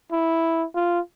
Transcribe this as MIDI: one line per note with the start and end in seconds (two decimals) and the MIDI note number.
0.12 0.64 64
0.75 1.00 65